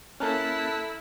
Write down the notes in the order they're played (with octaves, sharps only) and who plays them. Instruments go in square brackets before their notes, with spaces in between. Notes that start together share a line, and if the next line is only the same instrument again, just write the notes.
[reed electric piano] A#3 C#4 [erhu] E4 [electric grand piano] A4 A#5 F6 [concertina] A5 F#6